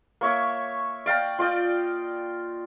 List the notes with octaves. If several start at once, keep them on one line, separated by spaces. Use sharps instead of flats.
A#3 C#5 E5 D6
D5 F5 G5 A#5
F4 D5 D#5 G5